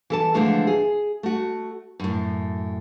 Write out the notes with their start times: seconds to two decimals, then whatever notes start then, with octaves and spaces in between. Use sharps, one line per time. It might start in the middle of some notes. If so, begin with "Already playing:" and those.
0.10 E3 A4 A5
0.34 D3 E3 F3 G#3 A3 D4
0.67 G#4
1.23 A3 F#4
2.00 F#2 A2